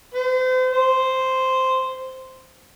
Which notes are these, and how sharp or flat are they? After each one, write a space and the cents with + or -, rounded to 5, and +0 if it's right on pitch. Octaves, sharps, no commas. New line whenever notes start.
C5 -40
C5 -5